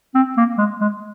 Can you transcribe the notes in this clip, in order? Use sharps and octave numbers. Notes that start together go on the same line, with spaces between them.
C4
A#3
G#3
G#3